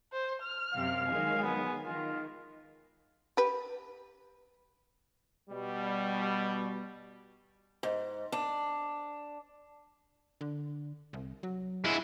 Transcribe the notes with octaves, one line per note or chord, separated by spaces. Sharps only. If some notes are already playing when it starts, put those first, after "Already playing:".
C5
F6
F#2 C3 F5
D#3 F#3 G#3 G#5
B3
D#3 F4
G4 B4
B2 G3
G#2
D4
D3
C2
F#3
G#3 E4